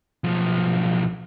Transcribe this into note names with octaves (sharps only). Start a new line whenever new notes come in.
B1 F3